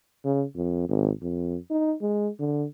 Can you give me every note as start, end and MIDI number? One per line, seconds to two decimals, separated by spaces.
0.24 0.44 49
0.55 0.87 41
0.89 1.10 32
1.21 1.57 41
1.71 1.94 63
2.01 2.29 56
2.39 2.66 50